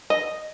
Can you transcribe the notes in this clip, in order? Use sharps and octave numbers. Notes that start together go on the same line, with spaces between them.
D#5